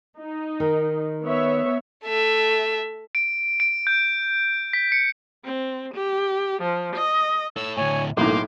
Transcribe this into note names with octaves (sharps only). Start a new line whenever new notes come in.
D#4
D#3
B3 C#5 E5
A3 E5
D7
D7
G6
B6
C#7
C4
G4
F3
D#5
A4 C#5 E6
D2 A2 C#5 G#5
B1 A2 A#3 C6 D6